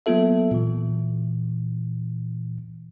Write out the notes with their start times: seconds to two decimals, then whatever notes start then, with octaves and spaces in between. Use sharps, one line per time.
0.06 F#3 A#3 B3 F4 A4 E5
0.52 A#2 E3